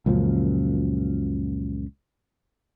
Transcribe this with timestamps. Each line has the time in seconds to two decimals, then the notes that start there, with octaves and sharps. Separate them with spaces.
0.06 C#2 F#2 A#2 F3